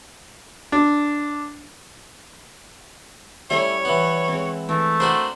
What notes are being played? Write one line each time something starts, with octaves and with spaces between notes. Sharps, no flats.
D4
G3 A3 C#4 E4 C#5
E3 B3
G#3 C4
E3 A3
D4 F#4 A#4 C5 F5 G5 G#5